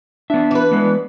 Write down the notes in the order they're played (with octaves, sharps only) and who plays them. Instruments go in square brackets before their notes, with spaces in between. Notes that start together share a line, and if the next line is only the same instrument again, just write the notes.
[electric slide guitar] B3 E5 [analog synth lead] D4
[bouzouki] E3 B4
[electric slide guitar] G#3 B3